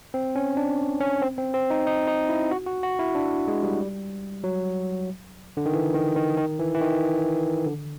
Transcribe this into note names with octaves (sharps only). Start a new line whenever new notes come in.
C4
C#4
D4
C#4
C4
C4
C4
D#4
D#4
D#4
E4
F#4
F#4
F#4
E4
D4
G#3
G3
F#3
D3
D#3
E3
D#3
D#3
D#3
E3
E3
D#3
D3